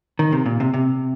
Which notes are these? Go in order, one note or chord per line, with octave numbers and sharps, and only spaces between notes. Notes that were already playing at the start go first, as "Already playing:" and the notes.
D#3
C3
A#2
C3
C3